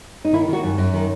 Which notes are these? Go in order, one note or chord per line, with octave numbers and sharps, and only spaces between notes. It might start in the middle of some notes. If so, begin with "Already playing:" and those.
D#4
D#3 E4
D#3 F#4
F#2
F#2
D#3